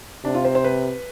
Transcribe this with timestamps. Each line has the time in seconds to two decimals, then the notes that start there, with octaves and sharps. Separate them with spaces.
0.24 C3 D4
0.34 F4
0.45 C5
0.55 C5
0.64 B4